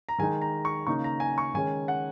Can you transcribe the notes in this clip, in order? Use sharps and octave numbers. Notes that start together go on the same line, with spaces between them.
A#5
D#3 G#3 D#4 G#5
A#5
C#6
C#3 A#3 D#4 C#6
A#5
G#5
C#6
D#3 G#3 C#4 G#5
F#5